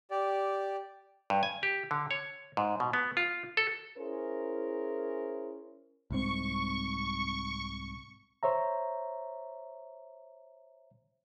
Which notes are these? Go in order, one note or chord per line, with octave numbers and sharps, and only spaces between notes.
G4 D5
G2
G#5
G4
D3
C#5
G#2
B2
B3
F4
A4
C#4 E4 G#4 A#4 C5
C2 G#2 C4 C#6
C5 C#5 E5 A#5